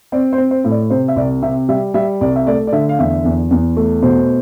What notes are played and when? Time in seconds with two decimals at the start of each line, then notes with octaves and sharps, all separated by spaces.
0.12 C4 D5
0.33 C5
0.38 C4
0.51 C5
0.64 A2
0.71 D5
0.90 C3 C5
1.08 E5
1.16 C2 D5
1.42 C3 E5
1.69 G3 E5
1.94 G3 E5
2.21 C2 D5
2.36 E5
2.47 A3 D5
2.67 D5
2.72 D3 E5
2.89 F5
2.99 E2 E5
3.25 E2
3.51 E2
3.77 A3
4.02 B2 C5